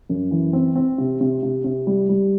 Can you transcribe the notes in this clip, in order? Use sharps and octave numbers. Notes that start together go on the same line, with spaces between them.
F#2
E3
C4
C4
C3
C3
C3
C3
G3
G3